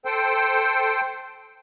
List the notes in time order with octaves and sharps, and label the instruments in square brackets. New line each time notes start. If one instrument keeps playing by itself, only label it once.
[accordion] A4 C5 G5